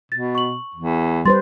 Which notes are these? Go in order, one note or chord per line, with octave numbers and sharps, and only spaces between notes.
B2 A6
C#6 F#7
E2
G3 B4 C5 C6 A6